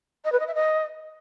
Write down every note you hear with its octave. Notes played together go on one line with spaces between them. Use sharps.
D#5
B4
D#5
E5
D#5